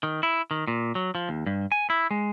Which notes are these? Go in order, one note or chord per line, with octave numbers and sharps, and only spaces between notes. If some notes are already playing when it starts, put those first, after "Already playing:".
D#3
E4
D#3
A#2
F#3
F3
D#2
G2
G#5
E4
G#3